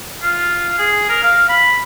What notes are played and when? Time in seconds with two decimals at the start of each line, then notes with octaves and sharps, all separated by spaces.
0.23 F4
0.78 G#4
1.09 A#4
1.23 F5
1.49 B5